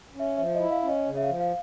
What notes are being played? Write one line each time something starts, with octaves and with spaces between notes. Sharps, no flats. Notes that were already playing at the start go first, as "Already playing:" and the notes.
C#4
E5
F3 E5
E4 D#5
F5
C#4
D#5
C#3
E5
F5
F3
F5